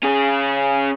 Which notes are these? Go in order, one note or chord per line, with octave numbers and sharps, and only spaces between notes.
C#4 G#4